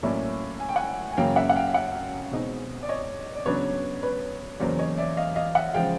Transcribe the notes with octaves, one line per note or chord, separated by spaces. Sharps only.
A2 F#3 A#3 C#4 D5 E5
G#5
G5
F#5 G#5
G#5
F#2 C#3 F#3 A#3 F5 G5
E5 F#5
F#5
F5 G5
E5 F#5
B2 G#3 C4 D#4
D5
C#5 D#5
D5
C#3 F#3 B3 D4 B4 C#5
B4 C#5
E2 C#3 F#3 A#3 C5 D5
C#5 D#5
D5 E5
D#5 F5
D#5 F5
E5 F#5
C#3 F3 G#3 F5 G5